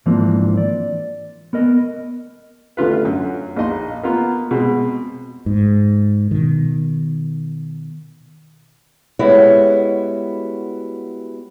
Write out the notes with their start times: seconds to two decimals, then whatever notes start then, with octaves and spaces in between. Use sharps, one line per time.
0.06 G#2 E3 F3 A#3 C4 D4
0.57 D5
1.53 B3 A#4 D#5
2.77 A1 D3 F4 B4
3.05 F#2
3.56 A#1 D#4 D#5 C6
4.03 A#3 B3 F4
4.51 B2 G#3 C4
5.46 G#2
6.31 B2 D#3
9.19 G3 G#3 B3 E4 F#4 C#5